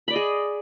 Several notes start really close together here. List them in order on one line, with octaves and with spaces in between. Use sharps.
B5 D5 D#5 G#4